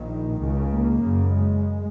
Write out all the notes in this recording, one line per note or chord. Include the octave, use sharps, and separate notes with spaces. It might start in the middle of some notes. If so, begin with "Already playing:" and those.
Already playing: A#1 A#2 D#3
C#2 C#3
A#3
F#1 F#2 C#3
G#3